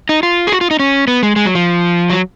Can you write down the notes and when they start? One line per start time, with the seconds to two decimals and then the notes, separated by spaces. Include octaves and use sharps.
0.09 D#4
0.23 F4
0.47 G#4
0.52 F#4
0.61 F4
0.71 D#4
0.79 C#4
1.08 B3
1.23 G#3
1.36 G#3
1.45 F#3
1.55 F3
2.10 F#3